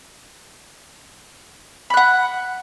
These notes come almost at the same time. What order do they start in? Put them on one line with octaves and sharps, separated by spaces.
B5 F#6 F#5